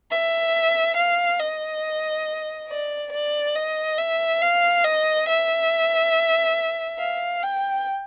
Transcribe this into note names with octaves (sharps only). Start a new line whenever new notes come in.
E5
F5
D#5
D5
D5
D#5
E5
F5
D#5
E5
F5
G5